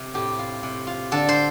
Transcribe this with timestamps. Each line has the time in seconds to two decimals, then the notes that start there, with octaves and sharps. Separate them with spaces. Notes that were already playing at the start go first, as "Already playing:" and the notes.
Already playing: C3
0.14 A2 G4
0.39 F4
0.63 C3
0.87 F4
1.12 D3 A4
1.29 C5